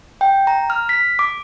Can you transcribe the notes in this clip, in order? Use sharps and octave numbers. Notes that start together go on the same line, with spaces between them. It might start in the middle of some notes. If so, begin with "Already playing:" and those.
G5
A#5
F6
B6
D6